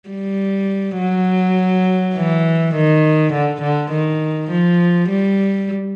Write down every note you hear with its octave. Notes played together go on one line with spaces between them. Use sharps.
G3
F#3
E3
D#3
D3
D3
D#3
F3
G3